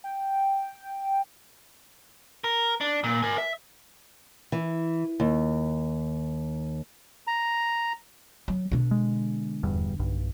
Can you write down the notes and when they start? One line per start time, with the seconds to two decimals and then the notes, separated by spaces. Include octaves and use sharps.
0.04 G5
2.44 A#4
2.81 D4
3.04 A#2
3.23 A#4 G#5
3.38 E5
4.52 E3
5.20 D#2
7.27 A#5
8.48 F#3
8.72 B2 D3
8.91 G#3
9.63 D#1 E2 G2
9.99 B1 G2